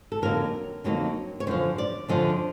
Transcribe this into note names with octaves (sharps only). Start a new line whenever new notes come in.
A4
F2 D3 F#3 A#3 D#4 A#4
F2 D3 F#3 A#3 D#4
C#5
F#2 D3 F3 C5
D5
F#2 D3 F3 D#5